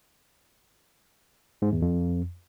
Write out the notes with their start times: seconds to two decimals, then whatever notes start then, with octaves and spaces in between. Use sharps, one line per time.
1.62 G#2
1.72 E2
1.82 F2